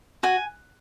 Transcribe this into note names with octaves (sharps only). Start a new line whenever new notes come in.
F#4 G#5